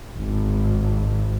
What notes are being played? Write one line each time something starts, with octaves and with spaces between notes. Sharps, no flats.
G#1